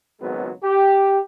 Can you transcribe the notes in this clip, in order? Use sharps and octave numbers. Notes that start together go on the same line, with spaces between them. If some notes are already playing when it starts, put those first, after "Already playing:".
G#1 C#2 F#3 G#3 B3
G4